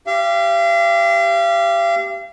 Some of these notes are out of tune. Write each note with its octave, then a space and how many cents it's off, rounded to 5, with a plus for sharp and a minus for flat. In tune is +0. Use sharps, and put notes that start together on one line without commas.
G4 -5 F5 -40